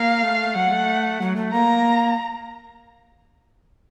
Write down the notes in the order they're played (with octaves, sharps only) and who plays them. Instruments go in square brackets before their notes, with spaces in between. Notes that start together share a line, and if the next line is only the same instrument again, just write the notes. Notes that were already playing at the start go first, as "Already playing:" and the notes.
Already playing: [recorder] A#3 [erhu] F5
[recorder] A3
[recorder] F#3 [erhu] F#5
[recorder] A3
F#3
A3
[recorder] A#3 [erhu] A#5